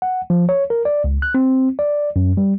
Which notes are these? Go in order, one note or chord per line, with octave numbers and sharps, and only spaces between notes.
F#5
F3
C#5
A#4
D5
C#2
F#6
C4
D5
F#2
G3